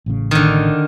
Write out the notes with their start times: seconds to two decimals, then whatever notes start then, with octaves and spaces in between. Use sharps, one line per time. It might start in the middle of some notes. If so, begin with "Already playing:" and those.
0.06 A1 A2 C#3
0.31 D3 D#3